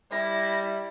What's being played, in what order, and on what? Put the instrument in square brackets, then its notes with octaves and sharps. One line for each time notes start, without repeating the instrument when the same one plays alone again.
[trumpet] G3 [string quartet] E4 [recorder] A#6